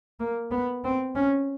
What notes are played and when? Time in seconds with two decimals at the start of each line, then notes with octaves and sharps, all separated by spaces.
0.20 A#3
0.51 B3
0.84 C4
1.15 C#4